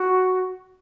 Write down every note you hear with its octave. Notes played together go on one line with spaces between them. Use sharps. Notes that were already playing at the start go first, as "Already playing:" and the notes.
Already playing: F#4